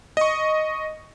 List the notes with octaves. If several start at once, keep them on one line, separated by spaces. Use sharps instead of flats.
D#5 C#6